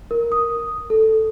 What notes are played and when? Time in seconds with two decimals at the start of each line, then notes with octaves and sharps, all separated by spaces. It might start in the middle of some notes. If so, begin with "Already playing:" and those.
0.11 A#4
0.32 D#6
0.90 A4